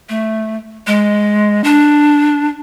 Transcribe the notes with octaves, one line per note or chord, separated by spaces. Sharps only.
A3
G#3
D4